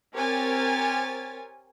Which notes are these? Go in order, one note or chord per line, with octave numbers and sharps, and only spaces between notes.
C4 G4 A#4 C#5 G#5 A6